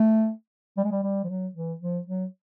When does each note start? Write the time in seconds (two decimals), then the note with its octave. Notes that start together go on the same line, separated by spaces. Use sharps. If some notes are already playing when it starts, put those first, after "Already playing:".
Already playing: A3
0.77 G3
0.84 G#3
0.92 G3
1.03 G3
1.24 F3
1.29 F#3
1.55 E3
1.81 F3
2.07 F#3